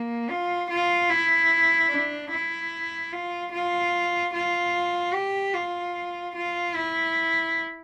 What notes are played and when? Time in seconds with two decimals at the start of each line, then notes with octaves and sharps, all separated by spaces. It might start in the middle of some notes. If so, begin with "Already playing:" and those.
Already playing: A#3
0.29 F4
0.70 F4
1.10 E4
1.90 D4
2.31 E4
3.12 F4
3.52 F4
4.34 F4
5.13 G4
5.54 F4
6.35 F4
6.75 E4